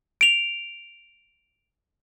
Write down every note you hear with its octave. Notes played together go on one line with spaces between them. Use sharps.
D7 F7